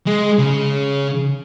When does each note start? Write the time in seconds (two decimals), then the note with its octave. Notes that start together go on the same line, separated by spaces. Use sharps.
0.07 G#3
0.39 C#3